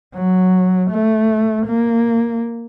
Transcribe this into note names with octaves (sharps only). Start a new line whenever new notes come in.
F#3
A3
A#3